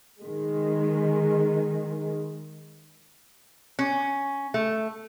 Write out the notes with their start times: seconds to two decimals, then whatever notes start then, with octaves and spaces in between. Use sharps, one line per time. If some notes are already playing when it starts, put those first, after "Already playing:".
0.21 D#3 G#3
3.79 C#4
4.54 A3